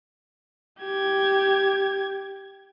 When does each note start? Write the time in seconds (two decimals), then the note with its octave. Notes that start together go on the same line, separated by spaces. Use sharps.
0.81 G4 G#6